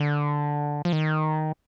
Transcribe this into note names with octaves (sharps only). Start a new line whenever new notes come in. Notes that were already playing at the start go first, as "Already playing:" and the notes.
Already playing: D3
F3
D#3